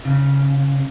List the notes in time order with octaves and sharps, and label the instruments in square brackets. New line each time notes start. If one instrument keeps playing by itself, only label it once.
[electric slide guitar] C#3